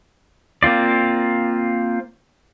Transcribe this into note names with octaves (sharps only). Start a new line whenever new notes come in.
A#3 C4 F4 D5